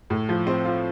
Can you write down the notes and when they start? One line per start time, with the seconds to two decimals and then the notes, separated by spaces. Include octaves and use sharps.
0.10 A2
0.29 F3
0.47 C4
0.65 F4